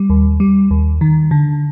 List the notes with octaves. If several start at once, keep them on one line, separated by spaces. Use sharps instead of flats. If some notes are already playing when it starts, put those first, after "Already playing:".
Already playing: G3
D#2
G3
D#2
D#3
D3